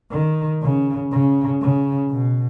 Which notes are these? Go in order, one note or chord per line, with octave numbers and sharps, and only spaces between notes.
D#3
C#3
C#3
C#3
B2